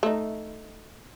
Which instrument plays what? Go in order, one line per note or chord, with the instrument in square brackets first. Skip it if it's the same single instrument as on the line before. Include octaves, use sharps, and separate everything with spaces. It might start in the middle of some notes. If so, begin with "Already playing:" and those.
[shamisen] A3 D#4